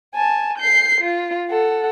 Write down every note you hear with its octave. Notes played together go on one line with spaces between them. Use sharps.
G#5 A5
G6 C7
F4
A4 F#5